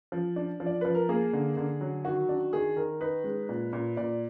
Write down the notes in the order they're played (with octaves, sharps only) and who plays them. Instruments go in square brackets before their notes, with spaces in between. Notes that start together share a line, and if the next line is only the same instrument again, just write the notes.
[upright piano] F3
D4
F3
[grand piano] D5
[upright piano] F3 [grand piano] B4
[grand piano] A#4
[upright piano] A#3 [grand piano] G#4
[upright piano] D3
D3
F#3
[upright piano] D#3 [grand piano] F#4
[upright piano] D4
[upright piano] D#3 [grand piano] G#4
[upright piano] D#3 [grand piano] A#4
[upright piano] D#4 [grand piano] B4
[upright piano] G#3
A#2
A#2
[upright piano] A#2 [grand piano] D5